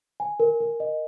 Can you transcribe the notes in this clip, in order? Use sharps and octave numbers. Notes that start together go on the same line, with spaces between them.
G#5
A#4
A#4
D#5